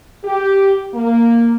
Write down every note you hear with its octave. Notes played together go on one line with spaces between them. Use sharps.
G4
A#3